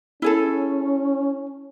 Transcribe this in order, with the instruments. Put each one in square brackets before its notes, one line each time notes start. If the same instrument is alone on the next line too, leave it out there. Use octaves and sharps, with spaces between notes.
[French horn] C#4 [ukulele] E4 G#4 A4